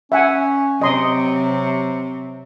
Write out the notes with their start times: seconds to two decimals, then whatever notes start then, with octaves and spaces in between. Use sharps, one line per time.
0.12 C#4 E5 F#5 G#5
0.82 C3 F#3 D#5 C6 D#6